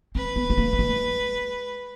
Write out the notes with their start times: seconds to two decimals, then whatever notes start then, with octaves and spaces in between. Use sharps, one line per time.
0.15 C4 B4
0.36 B3
0.50 A3
0.58 A#3
0.73 A3
0.79 G#3